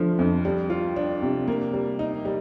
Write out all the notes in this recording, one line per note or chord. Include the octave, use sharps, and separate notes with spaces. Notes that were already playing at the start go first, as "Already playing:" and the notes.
Already playing: D3 F3 A3
F2
G3
F4
D4
C3
A#3
G3
D#4
G3